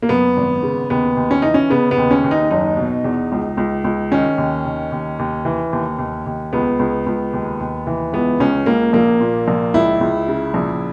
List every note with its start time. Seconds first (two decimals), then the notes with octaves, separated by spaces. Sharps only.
0.02 A#3
0.09 F#2 B3
0.37 G#1
0.63 C#3
0.90 D#2 B3
1.17 D#2
1.31 C#4
1.42 E3 D#4
1.54 C#4
1.70 C#3 B3
1.91 B3
1.98 D#2
2.11 C#4
2.24 D#2
2.31 D#4
2.51 F#1 D#4
2.77 B2
3.04 E2
3.32 C#2
3.57 C#2
3.84 C#2
4.12 D#3 C#4
4.38 D#2
4.66 D#3
4.92 D#2
5.19 D#2
5.45 E3
5.73 D#2
5.99 D#2
6.26 D#2
6.53 C#2 B3
6.79 C#2
7.06 C#2
7.33 D#2
7.60 D#2
7.87 E3
8.13 C#2 B3
8.40 C#2 C#4
8.66 C#2 A#3
8.93 A#1 A#3
9.20 A#2
9.48 A#1
9.74 C#2 E4
10.01 C#2
10.28 C#3
10.54 A#1